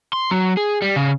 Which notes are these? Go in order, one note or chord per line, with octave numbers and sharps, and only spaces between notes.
C6
F#3
G#4
G3
C#3